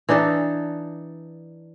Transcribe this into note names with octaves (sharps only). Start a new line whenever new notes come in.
E3 D4 D#4 A4